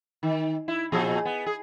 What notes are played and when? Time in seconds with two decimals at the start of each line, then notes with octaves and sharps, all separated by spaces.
0.23 D#3
0.68 E4
0.92 A#2 F3 G#4
1.25 B3
1.46 G#4